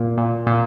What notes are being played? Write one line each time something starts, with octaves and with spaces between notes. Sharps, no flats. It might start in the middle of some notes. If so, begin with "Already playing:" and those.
Already playing: A#2 A#3
A#2
A#2